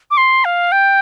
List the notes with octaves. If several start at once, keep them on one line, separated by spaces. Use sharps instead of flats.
D6
C6
F5
G5